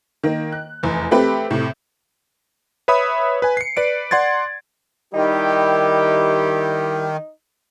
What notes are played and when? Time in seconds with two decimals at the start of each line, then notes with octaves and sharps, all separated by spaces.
0.23 D#3 A#3
0.52 F#6
0.83 F1 E2
1.11 A3 C4 G4 B4
1.51 A2 C3
2.88 B4 C#5 E5 B5 D#6
3.42 B4 G#5
3.57 C7 C#7
3.77 B4 D5 D7
4.11 D5 F#5 C6 G#6 A6
5.14 D#3 G3 D#4 E4 G4